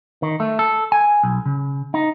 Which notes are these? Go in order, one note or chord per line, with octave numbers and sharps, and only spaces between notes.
D#3
A3
A4
G#5
B1
C#3
D#4